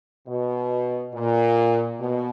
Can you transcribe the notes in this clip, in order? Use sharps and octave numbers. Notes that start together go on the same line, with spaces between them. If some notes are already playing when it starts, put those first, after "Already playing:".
B2
A#2
B2